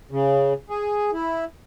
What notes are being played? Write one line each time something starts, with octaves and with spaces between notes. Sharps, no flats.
C#3
G#4
E4